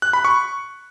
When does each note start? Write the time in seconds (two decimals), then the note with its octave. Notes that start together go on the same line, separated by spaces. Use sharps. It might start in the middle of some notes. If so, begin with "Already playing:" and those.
0.02 F#6
0.13 B5
0.25 C#6